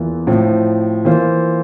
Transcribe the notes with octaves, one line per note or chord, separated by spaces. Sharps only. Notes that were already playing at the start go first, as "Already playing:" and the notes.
Already playing: E2 E3 A#3 F4 A#4
A2 F3 C4
E3 A#3 F4 C5